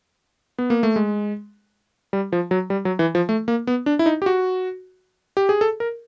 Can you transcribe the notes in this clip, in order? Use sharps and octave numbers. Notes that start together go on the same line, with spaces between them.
B3
A#3
A3
G#3
G3
F3
F#3
G3
F#3
E3
F3
A3
A#3
B3
D4
E4
D#4
G4
F#4
G4
G#4
A4
A#4